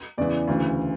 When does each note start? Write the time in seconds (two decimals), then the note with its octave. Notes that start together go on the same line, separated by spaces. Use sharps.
0.18 E2 C#3 E3 D5
0.47 D2 C#3 E3